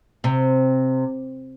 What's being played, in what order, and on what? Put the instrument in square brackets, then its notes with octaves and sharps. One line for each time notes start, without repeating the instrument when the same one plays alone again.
[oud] C3